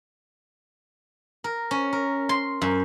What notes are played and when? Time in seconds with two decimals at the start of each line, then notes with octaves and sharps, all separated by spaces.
1.44 A#4
1.71 C#4
1.93 A#4
2.29 C6
2.62 F#2